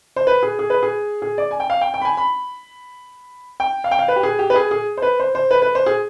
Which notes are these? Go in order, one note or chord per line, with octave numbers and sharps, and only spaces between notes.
C5
B4
G#4
G#4
B4
G#4
G#4
D5
G#5
G5
F5
G5
G5
B5
G#5
B5
G5
F5
G5
F5
B4
G4
G#4
G4
B4
G#4
G#4
C5
B4
C5
C5
B4
B4
C5
G#4